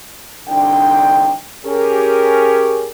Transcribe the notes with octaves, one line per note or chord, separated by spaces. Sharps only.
C2 D3 D4 D#4 G5
C#4 G4 G#4 A#4